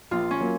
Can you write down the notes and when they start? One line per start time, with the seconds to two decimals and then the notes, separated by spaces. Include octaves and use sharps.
0.11 A#1 F4
0.31 C#4
0.41 F#3 A#3